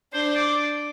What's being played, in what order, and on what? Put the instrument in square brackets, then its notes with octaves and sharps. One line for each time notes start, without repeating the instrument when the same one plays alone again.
[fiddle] D4 [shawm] C5
[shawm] D5